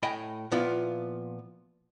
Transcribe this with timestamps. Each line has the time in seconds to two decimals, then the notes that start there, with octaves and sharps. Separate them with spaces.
0.03 A2 D#5 G5 G#5 B5
0.52 A#2 F3 B3 E4 F4